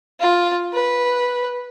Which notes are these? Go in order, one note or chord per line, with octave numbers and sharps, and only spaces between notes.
F4
B4